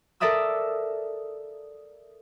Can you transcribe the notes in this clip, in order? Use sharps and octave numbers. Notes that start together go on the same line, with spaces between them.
A4 A#4 D5 E5 D#6 E6